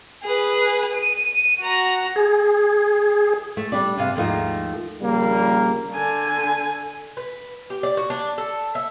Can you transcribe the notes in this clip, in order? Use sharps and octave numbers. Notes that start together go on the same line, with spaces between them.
G#4 B4
D#7
F#4 A#5
G#4
A3
G3 D4 D5
G2 C3 D4 F5
D#2 G#2 F3 A3 A#3 D#4
A#1 C#3 G3 A#3
D3 G#5
B4
G4
D5
F#4
D4
A4
E5